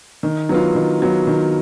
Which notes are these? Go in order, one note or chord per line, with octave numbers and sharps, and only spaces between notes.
D#3
F#3 B3 F4
D#3
F#3 B3 F4
D#3